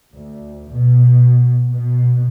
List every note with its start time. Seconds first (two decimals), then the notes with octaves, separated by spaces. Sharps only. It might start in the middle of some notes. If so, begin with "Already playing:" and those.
0.14 D2
0.71 B2
1.71 B2